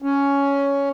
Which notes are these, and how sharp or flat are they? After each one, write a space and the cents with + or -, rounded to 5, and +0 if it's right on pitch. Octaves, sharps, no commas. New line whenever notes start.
C#4 +10